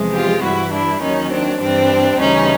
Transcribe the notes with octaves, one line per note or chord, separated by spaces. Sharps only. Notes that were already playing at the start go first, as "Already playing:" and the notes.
Already playing: E2 C3 F3 G#3
F4 G4
G2 E3 G3 E4 F#4
D4 E4
D#2 D#3 F#3 C#4 D#4
C4 D4
G2 E3 G3 C4 D4
D2 C#3 E3 G3 C#4 D#4